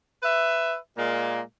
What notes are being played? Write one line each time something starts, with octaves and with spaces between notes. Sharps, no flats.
B4 E5
A#2 G#3 A#3